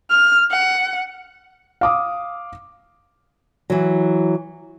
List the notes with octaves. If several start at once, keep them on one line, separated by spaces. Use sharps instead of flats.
F6
F#5
F5 D6 D#6
E3 F#3